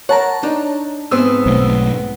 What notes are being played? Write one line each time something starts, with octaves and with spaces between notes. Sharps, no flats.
A#4 C#5 F#5 A5 A#5
D4 D#4
G#2 B3 C4 C5 D#6 E6
B1 A3